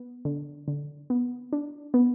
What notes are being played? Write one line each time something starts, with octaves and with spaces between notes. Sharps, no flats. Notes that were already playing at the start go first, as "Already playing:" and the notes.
Already playing: B3
D3
D3
B3
D4
B3